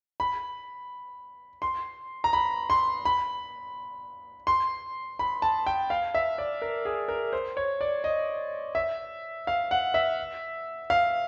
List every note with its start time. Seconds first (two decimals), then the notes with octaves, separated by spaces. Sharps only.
0.20 B5
1.62 C6
2.24 A#5
2.33 B5
2.70 C6
3.05 B5
4.47 C6
5.19 B5
5.42 A5
5.67 G5
5.90 F5
6.15 E5
6.38 D5
6.62 A#4
6.85 G#4
7.08 A#4
7.33 C5
7.57 C#5
7.81 D5
8.04 D#5
8.75 E5
9.47 F5
9.71 F#5
9.94 E5
10.90 F5